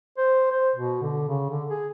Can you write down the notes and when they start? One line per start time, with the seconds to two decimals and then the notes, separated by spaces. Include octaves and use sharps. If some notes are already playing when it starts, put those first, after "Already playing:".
0.18 C5
0.52 C5
0.76 B2
1.03 D3
1.29 C#3
1.50 D3
1.70 G#4